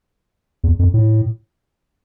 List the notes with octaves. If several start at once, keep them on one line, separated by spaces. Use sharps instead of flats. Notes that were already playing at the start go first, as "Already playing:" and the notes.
E2
F2
A2